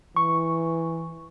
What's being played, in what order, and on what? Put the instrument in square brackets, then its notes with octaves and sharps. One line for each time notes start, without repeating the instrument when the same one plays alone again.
[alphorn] E3 [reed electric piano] C#6